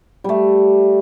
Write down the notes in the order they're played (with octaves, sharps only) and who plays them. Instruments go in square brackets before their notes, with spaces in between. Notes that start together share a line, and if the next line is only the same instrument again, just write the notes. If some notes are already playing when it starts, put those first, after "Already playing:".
[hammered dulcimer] G3 A3